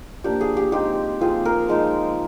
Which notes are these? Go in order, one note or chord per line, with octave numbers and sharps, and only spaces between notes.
F3 A#3 D4 G4
G#4
G4
G#3 C4 D#4 G4
F3 C4 F4 G#4
A#4
F3 G#3 D#4